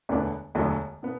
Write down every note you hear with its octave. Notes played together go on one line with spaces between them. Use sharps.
E1 D2 D3 B3 D4
E1 D2 D3 F#3
B2 B3